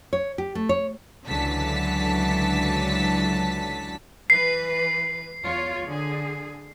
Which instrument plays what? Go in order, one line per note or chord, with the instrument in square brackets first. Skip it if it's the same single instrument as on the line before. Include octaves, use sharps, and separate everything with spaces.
[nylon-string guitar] C#5
G4
A3
C#5
[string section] C#2 D3 E3 F#3 A5 B6
[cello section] E3 B4 [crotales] C7
[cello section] E2 F4 C#5
D3 G#4